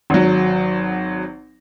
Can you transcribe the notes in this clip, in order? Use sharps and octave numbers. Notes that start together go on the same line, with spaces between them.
G#1 F#3